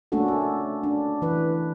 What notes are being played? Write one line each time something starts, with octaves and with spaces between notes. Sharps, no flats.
A3 A#3 C#4 D4 F#4 A4
A4
D4
E3 B4